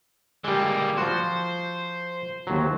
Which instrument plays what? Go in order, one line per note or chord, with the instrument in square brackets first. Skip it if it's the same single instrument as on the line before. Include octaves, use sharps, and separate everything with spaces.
[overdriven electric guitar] D3 A#3 [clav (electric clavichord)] G3 G#3
[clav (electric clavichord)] F3 F#4 [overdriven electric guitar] C5
[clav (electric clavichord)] D#2 F#3